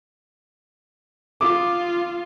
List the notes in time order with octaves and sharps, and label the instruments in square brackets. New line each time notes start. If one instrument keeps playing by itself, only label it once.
[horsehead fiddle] F4 [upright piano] D6 D#6